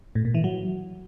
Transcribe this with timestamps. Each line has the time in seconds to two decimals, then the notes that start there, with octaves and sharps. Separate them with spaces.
0.15 A2
0.25 A#2
0.34 E3
0.44 F#3